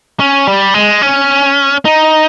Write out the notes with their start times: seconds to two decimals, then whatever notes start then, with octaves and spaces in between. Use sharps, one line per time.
0.20 C#4
0.47 G3
0.74 G#3
1.02 C#4
1.85 D#4